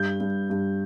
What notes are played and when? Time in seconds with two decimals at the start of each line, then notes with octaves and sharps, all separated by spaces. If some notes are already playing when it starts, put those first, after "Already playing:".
Already playing: G2 G6
0.20 G2
0.50 G2